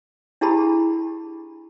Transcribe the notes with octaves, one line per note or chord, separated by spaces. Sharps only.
D4 E4 G4 G#4 A5 B5